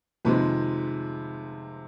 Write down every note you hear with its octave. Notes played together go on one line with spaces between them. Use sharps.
F2 C3 D#3 G#3 C4 B4